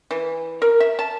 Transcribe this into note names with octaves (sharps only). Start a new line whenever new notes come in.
E3
A#4
E5
A5